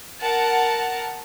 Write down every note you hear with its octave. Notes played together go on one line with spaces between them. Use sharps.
A#4 F#5 A5